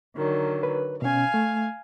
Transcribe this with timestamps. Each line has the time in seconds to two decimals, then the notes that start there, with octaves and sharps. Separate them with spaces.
0.16 D3 D#3 F#3
0.63 B4
1.02 B2 C#4 F5 G#5
1.34 A3